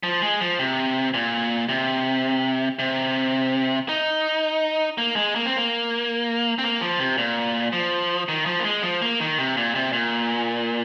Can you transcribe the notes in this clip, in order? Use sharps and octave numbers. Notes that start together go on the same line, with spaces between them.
F3
G#3
F3
C3
A#2
C3
C3
D#4
A#3
G#3
A#3
C4
A#3
C4
A#3
F3
C3
A#2
F3
D#3
F3
A#3
G#3
F3
A#3
D#3
C3
A#2
C3
A#2